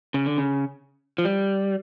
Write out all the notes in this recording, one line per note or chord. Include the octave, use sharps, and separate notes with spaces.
C#3
D3
C#3
F3
G3